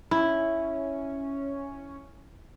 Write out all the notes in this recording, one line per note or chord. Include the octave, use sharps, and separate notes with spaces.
C#4 E4